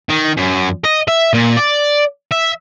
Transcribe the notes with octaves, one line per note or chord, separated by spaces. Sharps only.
D#3
F#2
D#5
E5
A#2
D5
E5